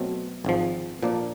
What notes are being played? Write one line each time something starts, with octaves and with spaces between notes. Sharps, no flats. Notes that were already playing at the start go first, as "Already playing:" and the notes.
Already playing: B2 F#3 A3 C4
G#1 G#2 F3
A#2 F3 A#3 D4